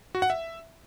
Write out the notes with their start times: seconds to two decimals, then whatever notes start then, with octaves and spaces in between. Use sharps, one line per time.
0.15 F#4
0.22 F#5
0.30 E5